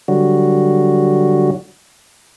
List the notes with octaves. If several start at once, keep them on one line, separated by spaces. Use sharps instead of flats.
D3 F#3 G3 F#4